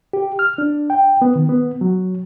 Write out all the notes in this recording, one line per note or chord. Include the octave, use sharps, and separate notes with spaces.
G4
F6
D4
G5
B3
D#3
B3
F#3